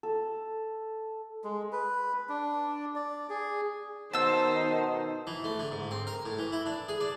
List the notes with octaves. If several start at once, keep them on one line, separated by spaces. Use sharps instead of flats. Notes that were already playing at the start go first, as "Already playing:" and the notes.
A4
G#3
B4
D4
D5
G#4
B2 D#3 D#4 C5 A5 E6
E3
A3
D3
G#2
C4
A#4
A2
E3
E4
D4
G#4
D4